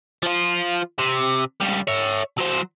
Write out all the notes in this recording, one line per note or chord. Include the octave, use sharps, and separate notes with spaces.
F3 F4
C3
C#2 G3
C#5 E5
F#3 C5